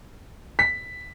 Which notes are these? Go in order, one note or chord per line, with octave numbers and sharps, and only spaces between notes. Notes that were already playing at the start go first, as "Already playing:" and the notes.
B6